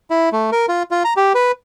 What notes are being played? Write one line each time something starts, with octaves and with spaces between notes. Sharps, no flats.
E4
A3
A#4
F4
F4
A#5
G4
B4